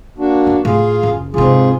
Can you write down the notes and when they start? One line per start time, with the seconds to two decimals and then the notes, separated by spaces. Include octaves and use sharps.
0.18 A#3 D4 F#4
0.47 B3
0.65 A2 F4 G#4 F5
1.03 F#1
1.34 G#2 C3 C4 F4 G#4